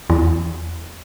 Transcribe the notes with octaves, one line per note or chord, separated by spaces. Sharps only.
E2